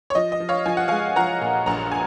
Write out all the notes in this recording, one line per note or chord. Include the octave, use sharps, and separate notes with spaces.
C#5
F3 D#5
D#5
F3
C#5 F5
F3 G#5
F#5
G#3 F5 G#5
F3 F#5 A#5
A#2
A#1 F#5 A#5
G#5